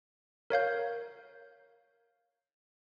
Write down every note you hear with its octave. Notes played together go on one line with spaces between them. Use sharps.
A#4 C#5 F5 G6